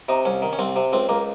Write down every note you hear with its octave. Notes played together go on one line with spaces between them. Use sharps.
C3 D#4
C2 C#4
D#3
C#4
C2 C4
C3
C#2 C4
C#2 A#3